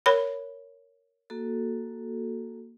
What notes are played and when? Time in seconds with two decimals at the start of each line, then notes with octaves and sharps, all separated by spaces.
0.06 A#4 C#5 B5
1.30 A#3 F#4 A4